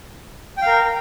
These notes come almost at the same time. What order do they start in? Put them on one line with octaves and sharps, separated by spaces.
G5 F5 A#4